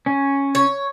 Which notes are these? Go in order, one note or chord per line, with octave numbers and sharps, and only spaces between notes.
C#4
C#5